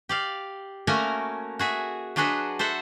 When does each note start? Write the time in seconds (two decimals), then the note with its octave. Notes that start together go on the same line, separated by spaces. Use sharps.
0.09 G4 D5 F5
0.87 A3 A#3 C#4 F#4 A#4 G#5
1.59 F#4 G#4 E5
2.16 F#3 D4 F#4 G#4 B4 D#5
2.59 A4 C5 E5 F#5